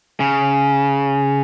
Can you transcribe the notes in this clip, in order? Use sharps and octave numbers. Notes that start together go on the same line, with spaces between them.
C#3